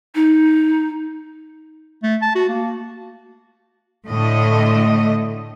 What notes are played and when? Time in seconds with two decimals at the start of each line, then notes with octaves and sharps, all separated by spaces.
0.15 D#4
2.03 A3
2.21 A5
2.35 F#4
2.49 A#3
4.08 A2 D3 A3 D#5